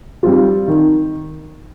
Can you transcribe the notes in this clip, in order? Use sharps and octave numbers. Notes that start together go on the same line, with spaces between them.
G3 C4 F4
D#3